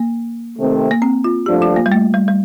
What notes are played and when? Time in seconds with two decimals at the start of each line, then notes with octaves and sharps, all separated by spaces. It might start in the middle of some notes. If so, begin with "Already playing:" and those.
Already playing: A#3
0.57 C3 D#3 A3 C4
0.91 A#3
1.02 C4
1.24 F4
1.46 G2 F3 A3 D4 G4
1.62 F4
1.77 A#3
1.86 G3
1.92 A3
2.14 G3
2.28 G3